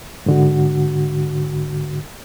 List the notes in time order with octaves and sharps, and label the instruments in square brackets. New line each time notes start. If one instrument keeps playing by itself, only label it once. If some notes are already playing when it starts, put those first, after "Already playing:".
[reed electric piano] G#2 D3 F#4